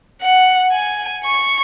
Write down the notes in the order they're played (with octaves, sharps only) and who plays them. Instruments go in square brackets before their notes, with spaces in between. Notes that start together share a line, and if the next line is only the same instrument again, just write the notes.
[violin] F#5
G#5
C#6